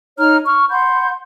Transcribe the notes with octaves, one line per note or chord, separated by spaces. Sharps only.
D#4 C#5 A#5 F6
C#6 F6
F#5 B5 C6 G6